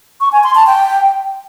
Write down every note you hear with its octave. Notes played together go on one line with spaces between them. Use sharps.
C#6
G#5
C6
A5
G5